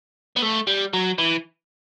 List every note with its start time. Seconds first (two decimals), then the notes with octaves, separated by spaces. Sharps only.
0.37 B3
0.43 A3
0.67 G3
0.93 F#3
1.18 E3